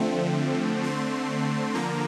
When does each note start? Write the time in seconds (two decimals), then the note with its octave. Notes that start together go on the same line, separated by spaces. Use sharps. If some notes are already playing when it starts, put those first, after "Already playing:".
Already playing: D3 F3 A3 C4
0.83 D3 A3 C4 C6
1.75 D3 F3 A#3 A#5